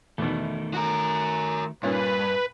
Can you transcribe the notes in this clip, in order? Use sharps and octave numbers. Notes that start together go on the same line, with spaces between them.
E2 B2 D#3 A3
F#4 A#4
G2 A#2 C#4 B4